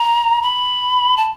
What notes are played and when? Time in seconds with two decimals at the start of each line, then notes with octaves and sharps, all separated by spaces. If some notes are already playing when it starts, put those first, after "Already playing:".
Already playing: A#5
0.42 B5
1.17 A5